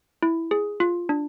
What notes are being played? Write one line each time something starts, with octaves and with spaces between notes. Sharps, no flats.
E4
G#4
F4
D4